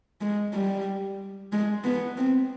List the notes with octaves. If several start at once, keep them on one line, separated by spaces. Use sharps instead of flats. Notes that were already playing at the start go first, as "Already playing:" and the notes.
G#3
G3
G#3
B3
C4